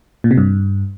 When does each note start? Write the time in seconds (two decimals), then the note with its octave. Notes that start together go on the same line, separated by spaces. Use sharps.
0.24 A#2
0.31 C3
0.37 G2